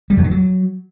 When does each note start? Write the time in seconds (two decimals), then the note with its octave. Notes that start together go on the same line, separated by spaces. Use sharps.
0.10 G3
0.17 E2
0.24 D#3
0.31 F#3